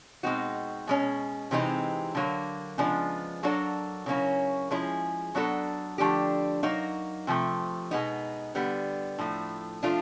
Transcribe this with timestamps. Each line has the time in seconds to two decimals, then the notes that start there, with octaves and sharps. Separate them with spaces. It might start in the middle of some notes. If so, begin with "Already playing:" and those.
0.23 B2 G#3 C4 D#4 F#4
0.87 B2 G#3 C#4
1.51 C3 E3 G#3 C4 D#4
2.15 D3 F#3 A#3
2.78 C#3 F3 G#3 B3 D4
3.43 F#3 A#3 D4 F#4 A4
4.06 C#3 F#3 A#3 C#4 E4
4.71 F3 G#3 C#4 E4 G#4
5.35 F#3 B3 D4 F#4 A4
5.98 D3 F3 A3 D4 G4
6.63 F#3 A#3 D#4 F#4
7.27 C3 F3 A3
7.91 B2 G#3 B3 D#4
8.55 D3 G3 B3
9.18 A2 F3 A3
9.83 F3 A3 D4 F4